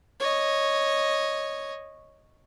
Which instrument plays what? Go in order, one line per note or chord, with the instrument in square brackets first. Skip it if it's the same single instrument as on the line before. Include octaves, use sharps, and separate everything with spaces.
[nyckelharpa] C#5 D#5